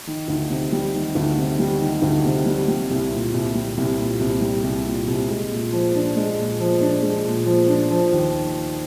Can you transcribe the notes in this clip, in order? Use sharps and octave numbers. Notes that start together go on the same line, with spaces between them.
D#3
D2
C3
G3
D#3
D2
C3
G3
D#3
D2
C3
G3
G3
C2
A#2
C2
G3
C2
A#2
C2
G3
C2
A#2
C2
G#3
A#2
F3
D4
G#3
A#2
F3
D4
G#3
A#2
F3
D4
F3
D#2